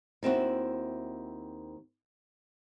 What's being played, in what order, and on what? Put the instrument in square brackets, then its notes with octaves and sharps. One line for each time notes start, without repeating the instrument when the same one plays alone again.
[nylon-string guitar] D#2 C4 E4 F#4